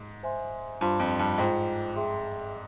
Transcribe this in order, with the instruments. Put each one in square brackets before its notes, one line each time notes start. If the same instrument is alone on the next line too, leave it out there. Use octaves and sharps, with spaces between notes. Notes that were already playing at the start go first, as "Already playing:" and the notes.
Already playing: [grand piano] G#2
[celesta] C5 E5 G#5 C6
[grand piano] G2 [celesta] F4 C5 F5 C6
[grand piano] F2
G2
[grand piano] G#2 [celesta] F4 C5 G5
[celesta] G#4 E5 G5 C6